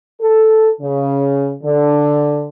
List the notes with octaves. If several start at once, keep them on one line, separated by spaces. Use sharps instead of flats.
A4
C#3
D3